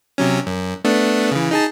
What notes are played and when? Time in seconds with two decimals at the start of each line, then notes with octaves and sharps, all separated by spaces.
0.18 C3 F#3 C#4
0.47 F#2
0.84 A3 B3 D4
1.31 C#3 E3
1.51 D#4 G#4 A5